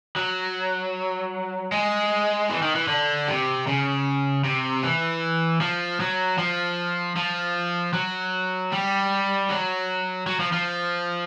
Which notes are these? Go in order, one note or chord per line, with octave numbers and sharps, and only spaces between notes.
F#3
G#3
E3
D#3
E3
D3
C3
C#3
C3
E3
F3
F#3
F3
F3
F#3
G3
F#3
F#3
F3
F3